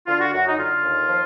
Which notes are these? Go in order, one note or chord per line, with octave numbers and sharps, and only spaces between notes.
D3 F4
F#4
F#2 F#4
D#4
D3 F4
D#2
F3